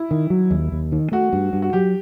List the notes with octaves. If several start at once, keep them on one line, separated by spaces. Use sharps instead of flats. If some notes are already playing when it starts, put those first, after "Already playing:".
Already playing: E4
D#3
F#3
D#2
D#2
D#3
A3 F#4
G2
G2
F#4
F#3 G4